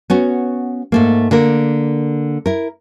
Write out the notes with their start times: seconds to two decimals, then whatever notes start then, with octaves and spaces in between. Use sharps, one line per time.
0.10 B3 C#4 F#4
0.92 G#2 A3 A#3
1.31 D3 A#3 A#4
2.46 E4 A#4